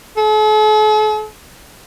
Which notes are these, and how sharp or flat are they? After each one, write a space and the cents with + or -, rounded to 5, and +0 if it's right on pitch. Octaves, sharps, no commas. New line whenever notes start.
A4 -45